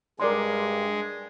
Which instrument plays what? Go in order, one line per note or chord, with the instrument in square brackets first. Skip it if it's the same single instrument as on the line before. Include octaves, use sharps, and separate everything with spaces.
[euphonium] G2 [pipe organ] G#3 [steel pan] A#4 D5 C6